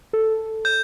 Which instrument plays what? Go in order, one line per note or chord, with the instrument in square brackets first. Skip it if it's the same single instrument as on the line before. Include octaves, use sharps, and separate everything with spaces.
[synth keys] A4
[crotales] G6